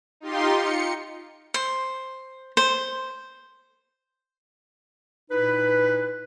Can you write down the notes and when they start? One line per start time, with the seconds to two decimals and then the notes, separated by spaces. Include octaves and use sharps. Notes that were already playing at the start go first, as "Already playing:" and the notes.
0.20 D#4 F4 G4 C6
0.55 C#7
1.54 C5
2.57 C5
5.31 A#2 D#4 E4 B4